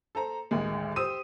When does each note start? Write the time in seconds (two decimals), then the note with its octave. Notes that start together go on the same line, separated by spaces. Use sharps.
0.15 A4 C5 A#5
0.51 A1 D2 D#3 G#3
0.96 G4 C5 D#6 E6 D#7